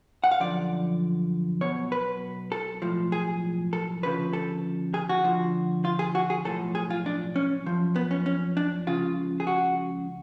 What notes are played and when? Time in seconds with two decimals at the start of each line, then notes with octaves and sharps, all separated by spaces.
0.24 F#5
0.31 F5
0.40 F#2 D3 F3 D5
1.61 B1 B2 C#5
1.92 B4
2.52 A4
2.82 B1 A2 F3
3.12 G#4
3.73 A4
4.03 D2 C#3 F3 B4
4.33 A4
4.94 G#4
5.09 F#4
5.24 D2 D3 F3
5.85 F4
5.99 G#4
6.15 F#4
6.30 G#4
6.45 B1 A2 F3 A4
6.75 G#4
6.90 F4
7.06 D4
7.36 C#4
7.66 F#2 F3
7.96 B3
8.11 C#4
8.26 C#4
8.57 D4
8.87 C#2 C#3 F3 F4
9.40 G#4
9.47 F#4